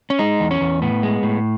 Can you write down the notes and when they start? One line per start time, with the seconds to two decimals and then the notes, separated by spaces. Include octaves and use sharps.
0.10 C#4
0.19 G#3 D#4
0.40 E2
0.51 C#4
0.61 E2
0.82 A2 B3
1.03 G#3
1.23 A2